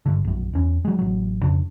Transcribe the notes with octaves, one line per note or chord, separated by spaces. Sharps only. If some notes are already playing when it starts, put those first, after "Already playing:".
G1 G2 D3
A#1 F#2
E2 C#4
F#3 G#3
A1 F#3
F2 C#3 D4